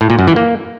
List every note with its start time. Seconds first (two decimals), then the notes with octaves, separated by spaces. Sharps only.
0.01 A2
0.10 A#2
0.19 F#2
0.27 E3
0.36 A#3